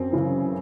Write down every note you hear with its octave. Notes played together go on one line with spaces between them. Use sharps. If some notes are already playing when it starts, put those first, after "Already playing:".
Already playing: F#2 C4
C#3 E3